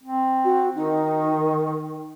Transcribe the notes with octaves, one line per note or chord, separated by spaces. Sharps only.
C4
F#4
D#3 D#4